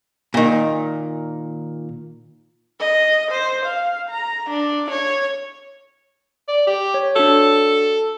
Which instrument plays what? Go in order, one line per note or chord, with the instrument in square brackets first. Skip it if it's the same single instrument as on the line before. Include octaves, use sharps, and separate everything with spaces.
[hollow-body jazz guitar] A#2 D#3
[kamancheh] D#5
C5
F5
A#5
D4
C#5
[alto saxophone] D5
G4
[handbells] C#5
[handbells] D4 F#4 [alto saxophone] A4